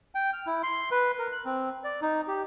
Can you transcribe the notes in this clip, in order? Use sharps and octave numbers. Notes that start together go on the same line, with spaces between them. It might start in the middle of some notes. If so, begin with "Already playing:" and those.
G5
F6
E4
C6
B4
A#4
F#6
C4
D5
D#4
G4